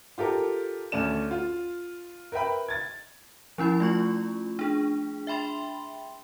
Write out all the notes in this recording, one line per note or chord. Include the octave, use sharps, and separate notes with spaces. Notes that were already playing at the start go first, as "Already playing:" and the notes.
F4 G4 A4 A#4
D2 C#4 A4 D5 E7
F4
A#4 B4 E5 G5 B5
G#6 A6
F3 C#4 E4 B5
A3 F4 C#6
D4 G#4
E5 G5 B5 C6